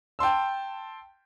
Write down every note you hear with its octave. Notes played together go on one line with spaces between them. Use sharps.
G5 A5 C6 E6